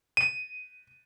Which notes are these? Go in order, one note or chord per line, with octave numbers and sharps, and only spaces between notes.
D#7